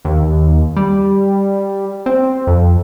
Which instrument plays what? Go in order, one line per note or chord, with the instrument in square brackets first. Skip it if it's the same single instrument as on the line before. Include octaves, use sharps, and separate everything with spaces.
[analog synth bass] D#2
G3
C4
F2